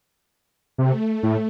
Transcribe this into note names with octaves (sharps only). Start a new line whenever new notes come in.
C3 A3
A2